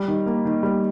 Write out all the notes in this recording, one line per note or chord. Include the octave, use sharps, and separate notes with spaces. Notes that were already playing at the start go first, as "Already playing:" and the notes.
Already playing: G3
D#3
A#3
D#3
G3